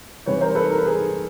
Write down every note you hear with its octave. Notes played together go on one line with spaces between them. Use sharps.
C3 E3 G3 B4 C#5
A#4 C5
A4 B4
A#4
B4
G#4 A#4